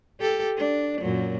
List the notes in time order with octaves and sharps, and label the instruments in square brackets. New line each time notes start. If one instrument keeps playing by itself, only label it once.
[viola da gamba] G4 A4
D4
F#2 A#2 F#3